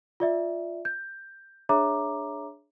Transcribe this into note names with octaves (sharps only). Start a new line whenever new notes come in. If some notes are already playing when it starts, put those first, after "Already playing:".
F4 D5 E5
G6
D4 G#4 C#5 E5 A#5 D6